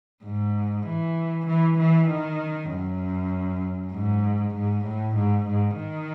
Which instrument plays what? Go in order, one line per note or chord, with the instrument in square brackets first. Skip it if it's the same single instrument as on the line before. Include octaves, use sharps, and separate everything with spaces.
[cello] G#2
E3
E3
E3
D#3
F#2
G#2
G#2
A2
G#2
G#2
D#3